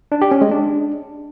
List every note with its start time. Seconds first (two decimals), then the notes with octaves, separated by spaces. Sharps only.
0.12 D4
0.22 G4
0.31 C#4
0.41 G#3
0.51 D4